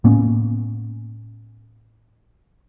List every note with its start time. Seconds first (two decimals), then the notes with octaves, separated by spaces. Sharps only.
0.04 A2 A#3 B3 C#4